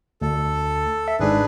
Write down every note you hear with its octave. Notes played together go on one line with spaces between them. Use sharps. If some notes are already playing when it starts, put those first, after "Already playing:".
D2 A4
E5
G#1 G#2 D4 G#4 B4